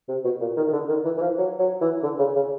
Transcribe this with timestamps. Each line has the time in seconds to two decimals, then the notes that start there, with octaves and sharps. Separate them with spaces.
0.09 C3
0.25 B2
0.40 A#2
0.57 D#3
0.67 D#3
0.73 D3
0.89 D#3
1.05 E3
1.18 E3
1.21 F3
1.38 F#3
1.59 F#3
1.81 E3
2.03 D3
2.19 C#3
2.36 C#3